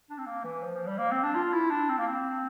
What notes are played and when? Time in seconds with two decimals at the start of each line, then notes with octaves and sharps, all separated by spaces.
0.10 D4
0.18 C4
0.26 A#3
0.44 E3
0.63 F3
0.74 F3
0.87 G3
0.98 A#3
1.11 C4
1.23 D4
1.35 F4
1.53 E4
1.70 D4
1.89 C4
1.98 A#3
2.07 C4